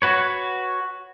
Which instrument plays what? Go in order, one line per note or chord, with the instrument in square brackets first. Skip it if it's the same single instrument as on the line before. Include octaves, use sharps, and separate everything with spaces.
[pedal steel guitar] F#4 B4 C#5